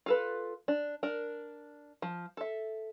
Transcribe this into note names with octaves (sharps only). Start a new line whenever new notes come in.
F4 A4 B4
D4
D4 A#4
F3
A4 E5